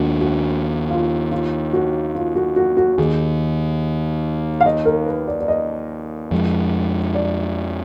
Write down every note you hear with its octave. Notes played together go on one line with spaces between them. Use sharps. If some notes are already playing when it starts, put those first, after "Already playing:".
Already playing: D#2 D#3 A#3 D4 F4 F#4
F#4
F4
F4
F#4
F4
F#4
F#4
F#4
D#2 D#3 A#3 G#4
F5
D#5
A#4
B4
D5
D5
D#5
F2 F3 G#3
D5